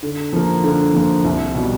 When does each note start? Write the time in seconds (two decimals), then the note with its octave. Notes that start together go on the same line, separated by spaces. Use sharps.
0.03 D3
0.33 F3 A#3
0.64 D3
0.94 F3 A#3
1.24 C2
1.54 B2 G3